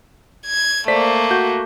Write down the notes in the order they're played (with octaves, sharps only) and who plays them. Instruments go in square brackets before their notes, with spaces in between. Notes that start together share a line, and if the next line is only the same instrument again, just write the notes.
[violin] G#6
[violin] A3 A#3 [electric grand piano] C5 D5 B6
[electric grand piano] F#4 G6